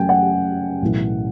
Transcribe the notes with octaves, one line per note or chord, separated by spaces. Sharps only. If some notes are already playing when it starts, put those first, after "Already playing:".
Already playing: F#2 C#3 F#3 A3 G5 G#5
F#5
B1 A2 E3